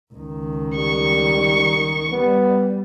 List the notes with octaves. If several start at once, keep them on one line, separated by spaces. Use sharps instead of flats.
C#2 D#3
G3 C#6
G3 B3